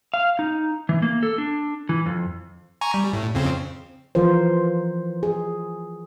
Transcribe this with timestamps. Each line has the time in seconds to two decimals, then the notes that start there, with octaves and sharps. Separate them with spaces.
0.14 F5
0.39 D#4
0.89 E3
1.02 A#3
1.23 A4
1.38 D4
1.89 E3
2.06 F2
2.81 G#5 A#5 C#6
2.94 G3
3.13 A2
3.35 F2 C#3 C4
4.15 E3 F3 F4 A#4 C5
5.23 G#4